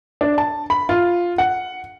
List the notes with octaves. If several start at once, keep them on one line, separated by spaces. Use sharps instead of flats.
D4
A5
B5
F4
F#5